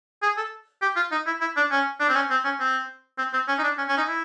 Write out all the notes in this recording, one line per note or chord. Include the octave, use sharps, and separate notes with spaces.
G#4
A4
G4
F4
D#4
E4
E4
D4
C#4
D4
C4
C#4
C4
C#4
C4
C4
C4
C#4
D#4
D4
C#4
C#4
D#4
E4